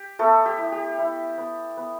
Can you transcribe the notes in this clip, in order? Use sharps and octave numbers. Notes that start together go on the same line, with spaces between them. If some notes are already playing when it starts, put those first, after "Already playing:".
Already playing: G4
A3 B3 A4
G4
E4
G4
E4
B3
B3